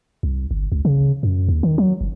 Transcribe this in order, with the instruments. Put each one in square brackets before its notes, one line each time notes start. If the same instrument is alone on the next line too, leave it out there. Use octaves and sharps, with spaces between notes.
[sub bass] C2
G1
C#2
C#3
F#2
D#2
D#3
F#3
F#1